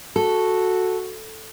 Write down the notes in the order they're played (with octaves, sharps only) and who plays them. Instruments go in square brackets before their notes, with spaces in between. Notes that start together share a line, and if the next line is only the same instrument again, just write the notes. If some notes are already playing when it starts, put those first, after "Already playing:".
[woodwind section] F#4 [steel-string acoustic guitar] A4